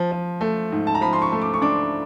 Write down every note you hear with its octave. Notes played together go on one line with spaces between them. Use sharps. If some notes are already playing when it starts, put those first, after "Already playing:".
Already playing: F3
F3
A3
G#2
A5
A#5
F3 B5
C6
C#6
A3
D6
C#6
D4 D6